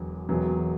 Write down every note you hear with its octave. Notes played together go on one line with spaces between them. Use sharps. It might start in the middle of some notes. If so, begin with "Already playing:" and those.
Already playing: E1 E2 D3 F#3
E1 E2 B2 F#3